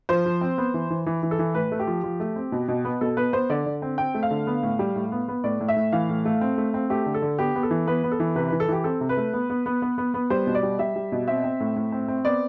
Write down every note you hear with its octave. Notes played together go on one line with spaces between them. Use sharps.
F3 C5
F3
C4
B3
E3
E3
E3
E3
A4
E3
A2 B4
A3
G4
F3
F3
A3
C4
B2
B2
B3
B2 A4
B3 B4
B3 C5
D3 D5
D3
C4
C4 G5
A3
F5
D3
B3
A2
G3
A2
B3
B3
A2 D5
A2
E5
A2
E3 F5
A2
A3
C4
A3
C4
A3 G4
D3
A4
D3
B3 G4
B3
A4
E3
B3 B4
B3
A4
E3
C3 B4
E3 B4
A4
E3 G4
C4 A4
C3
B4
A3
B3
B3
B3
B3
B3
B3
G3 C5
B2
D5
G3
G3 E5
G3
B2
C4 E5
C4
A2
A2
C4
C4
B3 D5